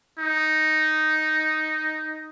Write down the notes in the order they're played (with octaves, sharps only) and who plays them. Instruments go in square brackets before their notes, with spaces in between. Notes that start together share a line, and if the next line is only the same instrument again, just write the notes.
[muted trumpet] D#4